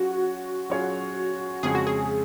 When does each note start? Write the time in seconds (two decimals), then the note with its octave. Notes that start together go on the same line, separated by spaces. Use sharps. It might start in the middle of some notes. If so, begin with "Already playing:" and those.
Already playing: F#3 C#4 F4 F#4 G#4 C#5
0.70 F#3 C#4 F4 G#4 C#5
1.63 F2 C#3 G#3 C#4 G#4
1.75 F#4
1.87 G#4